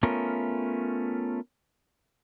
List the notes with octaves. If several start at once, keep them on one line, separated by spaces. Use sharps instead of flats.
A3 B3 C#4 F4 A#4